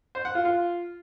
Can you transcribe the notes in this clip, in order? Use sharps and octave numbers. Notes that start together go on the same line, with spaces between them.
C5
F#5
F4
F4